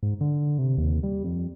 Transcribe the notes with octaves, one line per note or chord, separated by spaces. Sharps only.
G#2
D3
C3
D#2
G3
F2